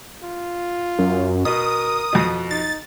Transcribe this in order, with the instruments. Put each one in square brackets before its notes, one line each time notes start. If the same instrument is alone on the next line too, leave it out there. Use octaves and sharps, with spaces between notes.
[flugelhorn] F4
[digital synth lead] F#2
[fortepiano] B2 [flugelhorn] A#4 [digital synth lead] D#6
[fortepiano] F2 B2
[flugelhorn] D#4 [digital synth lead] A6